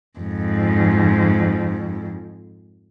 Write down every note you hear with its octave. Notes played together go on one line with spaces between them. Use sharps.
F2 G#2